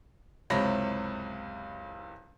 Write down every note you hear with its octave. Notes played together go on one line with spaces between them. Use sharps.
F#1 C#2 C3 C#5 B5 A#6